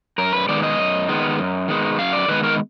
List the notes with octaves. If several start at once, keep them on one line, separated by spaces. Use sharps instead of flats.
F#2 A#4
B4
D#3 G#3 B3 D5
D#5
F#2
D#3 G#3 B3
F#2
D#3 G#3 B3
F#2 F5
D5
D#3 G#3 B3 B4
A#4